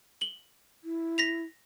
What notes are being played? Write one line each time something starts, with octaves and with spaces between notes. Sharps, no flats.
F#7 G7
E4
A#6 B6 F7